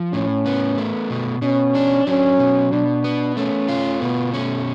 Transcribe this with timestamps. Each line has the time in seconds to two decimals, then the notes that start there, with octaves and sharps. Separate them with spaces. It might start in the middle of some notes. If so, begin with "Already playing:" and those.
Already playing: F3
0.13 A2 C#4
0.46 B3
0.78 A3
1.10 B2
1.42 B2 C#4
1.75 D4
2.07 F#3 C#4
2.39 B2
2.72 B2 D4
3.04 B3
3.36 A3 C#4
3.68 F4
4.01 B2 B3
4.33 A3 C#4